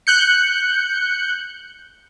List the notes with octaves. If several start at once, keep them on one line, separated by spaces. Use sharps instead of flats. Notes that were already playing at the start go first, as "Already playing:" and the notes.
F#6 G6 C#7